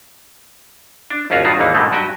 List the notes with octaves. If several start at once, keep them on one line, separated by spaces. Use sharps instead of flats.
D4
G#1 D#2 C#4 F4 F#4 C#5
G2 D#3 F4 F#4
G#1 D#2 D#3 E3 A#3 D#4
G#2 B2 D3 D#3 A3 A#3
G2 F#3 F#4 G4 D#5 G#5